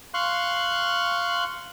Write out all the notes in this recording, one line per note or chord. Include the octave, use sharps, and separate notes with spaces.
F5 C6 C#6 F#6